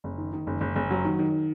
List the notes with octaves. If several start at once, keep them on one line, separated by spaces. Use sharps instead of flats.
F#1
D#3
D#3
F#1
F#1
F#1
F#3
D#3
D#3